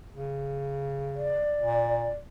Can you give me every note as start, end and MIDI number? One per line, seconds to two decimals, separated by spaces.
0.13 1.46 49
1.15 2.12 74
1.61 2.09 46